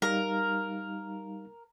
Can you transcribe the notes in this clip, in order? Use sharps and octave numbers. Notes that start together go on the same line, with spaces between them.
G3 D#4 A#4 F5